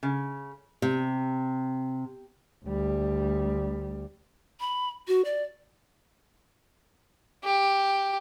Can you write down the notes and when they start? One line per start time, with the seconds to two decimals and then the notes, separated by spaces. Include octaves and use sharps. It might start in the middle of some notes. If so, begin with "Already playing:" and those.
0.03 C#3
0.82 C3
2.66 D2 G3
4.60 B5
5.08 F#4
5.25 D5
7.44 G4